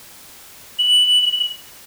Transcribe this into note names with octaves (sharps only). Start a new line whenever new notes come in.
F#7